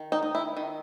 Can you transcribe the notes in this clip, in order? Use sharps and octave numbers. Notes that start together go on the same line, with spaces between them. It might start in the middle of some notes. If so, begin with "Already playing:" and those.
Already playing: D#3
D#4
D#4
E4
D#3